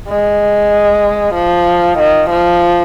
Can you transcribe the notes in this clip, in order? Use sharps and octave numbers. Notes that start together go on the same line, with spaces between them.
G#3
F3
D#3
F3